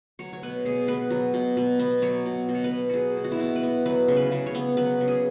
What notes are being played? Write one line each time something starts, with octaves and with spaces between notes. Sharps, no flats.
F#3 C#5
C#5
B2 B4
B2 G#4
B3 B4
F#3
B2
B2
B3
F#3 C#5
B2
B2
C#5
B4
B3
F#3 F#4 G#4
B2
F#4
E4
B2 F#4
B4
B3
F#3 B4
C#3
B4
C#3
C#5
B3
F#3 B4
C#3
G#4